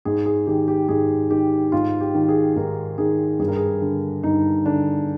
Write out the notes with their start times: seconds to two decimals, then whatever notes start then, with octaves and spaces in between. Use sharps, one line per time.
0.05 G#2 G#4
0.26 G#4
0.47 D#3 G4
0.68 G4
0.89 G#2 G#4
1.30 D#3 G4
1.72 G#2 F4
2.01 G4
2.14 D#3
2.29 G#4
2.56 G#2 A#4
2.98 D#3 G#4
3.40 G2 G#4
3.48 A#4
3.56 G#4
3.82 D3
4.23 G2 D#4
4.66 D3 D4